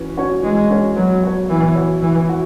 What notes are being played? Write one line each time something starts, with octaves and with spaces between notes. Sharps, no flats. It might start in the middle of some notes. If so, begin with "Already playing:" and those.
Already playing: E3 C#4 F#4
C#4 F#4 C#5
E3 G#3
C#4 F#4 C#5
F#3 B3
F#4 C#5
E3 B3
F#4 C#5
E3 B3
F#4